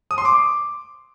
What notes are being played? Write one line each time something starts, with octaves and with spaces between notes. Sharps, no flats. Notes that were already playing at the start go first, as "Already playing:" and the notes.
D#6
C6
D6